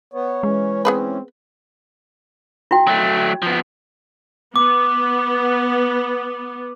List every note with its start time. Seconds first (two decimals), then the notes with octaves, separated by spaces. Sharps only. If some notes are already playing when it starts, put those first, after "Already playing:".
0.14 B3 C#5
0.43 E3 G#3 C#4
0.85 B3 C4 G#4 B4
2.71 E4 F#4 G5
2.87 F#3 A3
3.42 F3 B3
4.56 B3 D6